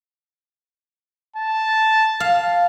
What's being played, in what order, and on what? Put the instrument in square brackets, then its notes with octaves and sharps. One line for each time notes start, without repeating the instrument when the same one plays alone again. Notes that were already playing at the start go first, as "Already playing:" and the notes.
[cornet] A5
[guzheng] F5